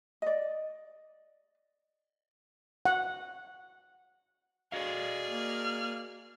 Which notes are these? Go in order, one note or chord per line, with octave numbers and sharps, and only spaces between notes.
D5 D#5
F#5
F#4 G#4 D5 D#5 F5
A#3 F6